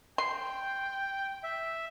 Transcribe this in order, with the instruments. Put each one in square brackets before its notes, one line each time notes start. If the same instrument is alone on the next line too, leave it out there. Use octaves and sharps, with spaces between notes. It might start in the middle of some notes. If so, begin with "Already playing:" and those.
[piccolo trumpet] G5 [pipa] C6
[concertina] E5